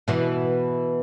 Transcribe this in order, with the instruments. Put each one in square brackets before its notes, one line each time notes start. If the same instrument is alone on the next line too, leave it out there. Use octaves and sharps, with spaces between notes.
[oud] B2 E3